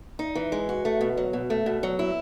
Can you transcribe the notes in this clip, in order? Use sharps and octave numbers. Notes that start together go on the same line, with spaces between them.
D#4
E3
G#3
F#4
A3
B2
F#3
B2
A3
B2
F#3
E4